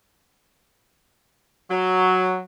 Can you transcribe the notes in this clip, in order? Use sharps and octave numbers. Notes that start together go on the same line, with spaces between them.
F#3